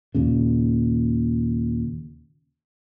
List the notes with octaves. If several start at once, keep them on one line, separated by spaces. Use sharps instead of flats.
D#2 A#2 C#3